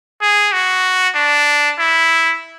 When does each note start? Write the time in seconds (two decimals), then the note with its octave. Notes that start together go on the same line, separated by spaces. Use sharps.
0.22 G#4
0.53 F#4
1.15 D4
1.79 E4